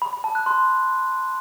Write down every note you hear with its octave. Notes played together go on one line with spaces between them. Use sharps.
B5
B5
A5
F#6
C6